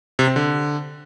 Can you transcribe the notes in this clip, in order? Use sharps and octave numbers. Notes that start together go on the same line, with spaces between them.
C3
C4
D3